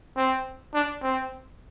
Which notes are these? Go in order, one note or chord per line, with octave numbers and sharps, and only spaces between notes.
C4
D4
C4